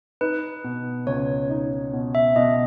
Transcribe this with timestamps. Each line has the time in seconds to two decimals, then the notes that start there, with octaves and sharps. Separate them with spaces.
0.21 D#4 B4
0.64 B2
1.06 C#2 C#5
1.49 D#4
1.93 B2
2.15 E5
2.36 B2 D#5